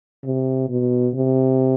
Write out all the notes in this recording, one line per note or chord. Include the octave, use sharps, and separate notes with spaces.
C3
B2
C3